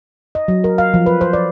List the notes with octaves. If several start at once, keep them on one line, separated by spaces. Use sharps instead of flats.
D#5
F#3
A#4
F5
F3
B4
C5
D5